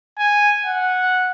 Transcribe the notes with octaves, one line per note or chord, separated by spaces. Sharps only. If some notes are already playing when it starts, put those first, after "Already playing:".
G#5
F#5